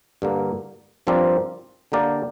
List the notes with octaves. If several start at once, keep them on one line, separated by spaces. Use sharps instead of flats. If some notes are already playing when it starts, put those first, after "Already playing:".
G2 D3 A#3
G2 F3 C4 A#4 D5
D3 A#3 G4 A#4 D5